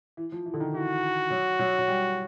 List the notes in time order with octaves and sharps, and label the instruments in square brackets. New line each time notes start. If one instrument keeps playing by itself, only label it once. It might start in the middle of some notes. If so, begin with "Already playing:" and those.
[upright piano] E3
F3
E3
D3
D#3
[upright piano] E3 [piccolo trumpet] F#4
[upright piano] F#3
F#3
F#3
G3